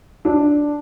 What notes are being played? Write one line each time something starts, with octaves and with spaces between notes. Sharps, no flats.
D4